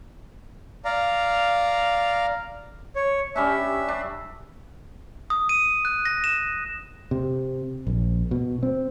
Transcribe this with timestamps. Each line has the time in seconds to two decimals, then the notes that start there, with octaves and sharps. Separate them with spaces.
0.85 D5 F5 A#5
2.96 C#5
3.36 G3 C#4 D4 E5
3.88 D4
5.30 D#6
5.49 D#7
5.85 F#6
6.05 A#6
6.24 E7
7.11 C3
7.87 A#1
8.31 B2
8.63 C4